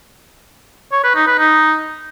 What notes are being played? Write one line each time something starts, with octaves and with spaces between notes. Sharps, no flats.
C#5
B4
D#4
B4
D#4